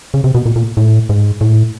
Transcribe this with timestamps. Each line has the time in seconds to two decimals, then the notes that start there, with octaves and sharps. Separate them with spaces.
0.14 C#3
0.24 C3
0.35 B2
0.46 A#2
0.56 A#2
0.77 A2
1.09 G#2
1.41 A2